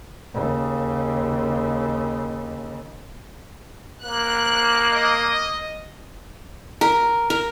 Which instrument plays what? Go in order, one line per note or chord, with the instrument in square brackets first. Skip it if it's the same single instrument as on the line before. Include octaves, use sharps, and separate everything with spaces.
[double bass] D#2 C#3
[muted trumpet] A#3 [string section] F#6
[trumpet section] D#5
[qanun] A#4
A#4